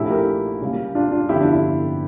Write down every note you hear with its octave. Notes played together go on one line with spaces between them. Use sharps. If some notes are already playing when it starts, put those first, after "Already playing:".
Already playing: A#1 A#2 A3 E4 G4
G4 A#4
C#2 C#3 G3 A#3
D4 F4
D4 F4
G1 F2 D3 E4 G4
D4 F4
E4